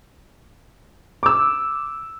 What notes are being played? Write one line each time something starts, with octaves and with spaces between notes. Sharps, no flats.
D6 E6